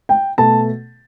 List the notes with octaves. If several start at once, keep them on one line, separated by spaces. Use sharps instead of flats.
G5
B2 A3 A5